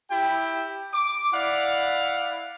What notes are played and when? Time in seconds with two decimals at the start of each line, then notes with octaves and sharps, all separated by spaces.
0.11 E4 G4 G5
0.93 D6
1.33 E4 D5 F5 F#5